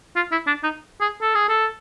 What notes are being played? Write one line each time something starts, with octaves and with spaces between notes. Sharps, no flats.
F4
E4
D4
D#4
G#4
A4
G#4
A4